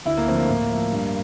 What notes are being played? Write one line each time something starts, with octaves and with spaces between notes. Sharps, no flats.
D2 E4
A#3
D3 F3 A3 C4
A#3
A2
F3 A3
G2